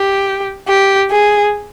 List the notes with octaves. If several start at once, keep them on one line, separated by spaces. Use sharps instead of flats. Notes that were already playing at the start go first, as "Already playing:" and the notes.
Already playing: G4
G4
G#4